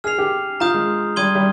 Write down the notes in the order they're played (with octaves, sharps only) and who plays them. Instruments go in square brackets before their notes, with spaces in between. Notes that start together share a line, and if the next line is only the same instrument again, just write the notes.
[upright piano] G#4 [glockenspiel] F6 C7 F7
[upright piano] G4
[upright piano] F4 [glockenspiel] A#5 D#6 G6
[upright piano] G#3
[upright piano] G3 [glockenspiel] C6 D#6 G#6 D#7 G7
[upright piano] G3